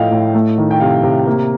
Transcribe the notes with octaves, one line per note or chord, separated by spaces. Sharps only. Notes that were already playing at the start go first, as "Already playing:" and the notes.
Already playing: A2 F3 A3 D#5 F5 G5
A2
A3
D#3
G5
C3 F5
C3
A#3